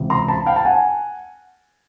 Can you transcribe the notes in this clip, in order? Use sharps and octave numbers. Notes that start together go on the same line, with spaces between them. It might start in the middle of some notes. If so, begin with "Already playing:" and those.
Already playing: C#2 C3 E3
A#5 C6
A5 B5
F5 G5
A5
F#5 G#5